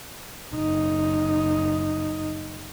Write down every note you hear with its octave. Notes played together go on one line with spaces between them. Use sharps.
F#1 D#4